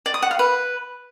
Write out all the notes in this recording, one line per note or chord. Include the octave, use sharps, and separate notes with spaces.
D5
D#6
F#5
F5
B4